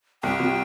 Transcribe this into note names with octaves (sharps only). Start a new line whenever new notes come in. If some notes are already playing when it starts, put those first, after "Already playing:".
C2 G5
C3